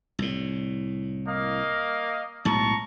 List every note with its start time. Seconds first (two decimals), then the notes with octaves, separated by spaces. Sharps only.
0.19 C2 A2
1.27 A#3 D#5 F5
2.45 B1 A2 G#3 A5 A#5 C#6